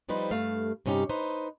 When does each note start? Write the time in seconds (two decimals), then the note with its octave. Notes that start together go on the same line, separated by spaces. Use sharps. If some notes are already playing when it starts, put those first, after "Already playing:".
0.09 F3 G3 D#4 B4 C5
0.31 G2 A3 F5
0.86 G2 C3 C#4 D#4 G4
1.09 D#4 B4 C5